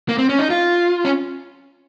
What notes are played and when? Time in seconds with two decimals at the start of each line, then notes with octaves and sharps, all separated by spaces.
0.09 A#3
0.18 C4
0.29 C#4
0.39 D#4
0.50 F4
1.05 C#4